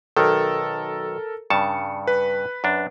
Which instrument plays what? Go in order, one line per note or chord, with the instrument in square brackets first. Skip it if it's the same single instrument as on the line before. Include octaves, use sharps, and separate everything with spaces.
[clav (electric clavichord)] B1 D#3 [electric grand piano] A4 A#4
[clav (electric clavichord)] G2 C#3 A5 [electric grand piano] C#7
[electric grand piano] B4
[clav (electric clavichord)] F#2 D4